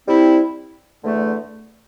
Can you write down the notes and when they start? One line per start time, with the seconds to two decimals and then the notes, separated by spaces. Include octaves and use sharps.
0.06 C3 G3 C4 E4
1.02 E2 D3 A3